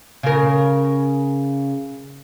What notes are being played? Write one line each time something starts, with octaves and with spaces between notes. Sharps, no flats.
C#3 A#4